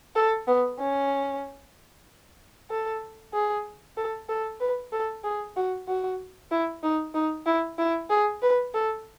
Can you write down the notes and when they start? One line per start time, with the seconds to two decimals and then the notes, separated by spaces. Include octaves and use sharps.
0.16 A4
0.48 B3
0.80 C#4
2.70 A4
3.33 G#4
3.97 A4
4.29 A4
4.60 B4
4.93 A4
5.24 G#4
5.56 F#4
5.88 F#4
6.51 E4
6.83 D#4
7.14 D#4
7.46 E4
7.79 E4
8.10 G#4
8.42 B4
8.74 A4